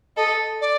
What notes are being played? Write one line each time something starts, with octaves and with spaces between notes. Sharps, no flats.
A4 D#5
D5